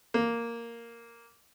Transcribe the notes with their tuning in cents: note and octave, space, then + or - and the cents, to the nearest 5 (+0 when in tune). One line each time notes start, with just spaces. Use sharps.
A#3 -5